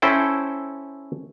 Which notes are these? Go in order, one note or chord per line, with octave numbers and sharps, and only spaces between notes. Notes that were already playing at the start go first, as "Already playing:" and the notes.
C#4 E4 A4 C5 G5